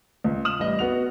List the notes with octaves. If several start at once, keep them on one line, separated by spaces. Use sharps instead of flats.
C#2
D#6 F6 E7 F#7
A1 G3 D#5
B3 F#4 F7